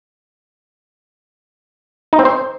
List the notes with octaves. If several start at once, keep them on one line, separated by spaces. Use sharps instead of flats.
D#4
C4
C5